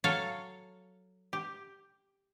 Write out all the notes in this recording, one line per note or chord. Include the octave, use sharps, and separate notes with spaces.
F#3 A4 C#5 F5
G4